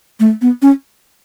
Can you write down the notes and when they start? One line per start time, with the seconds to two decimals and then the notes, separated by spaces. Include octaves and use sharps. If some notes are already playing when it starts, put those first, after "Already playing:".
0.20 A3
0.42 B3
0.62 C#4